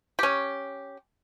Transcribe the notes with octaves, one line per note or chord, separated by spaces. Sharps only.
C#4 G4